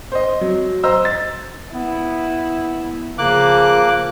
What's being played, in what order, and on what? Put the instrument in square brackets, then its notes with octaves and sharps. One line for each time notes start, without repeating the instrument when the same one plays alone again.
[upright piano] C5 D#5
F#3
C5 D#5 A#5 E6
A6
[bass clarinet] B3 [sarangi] E4
[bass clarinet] C#3 [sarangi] F3 [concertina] A#3 D6 F#6